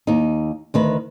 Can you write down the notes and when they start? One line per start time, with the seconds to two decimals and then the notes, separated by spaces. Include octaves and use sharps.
0.07 D#2 D#4
0.74 D2 D#3 B4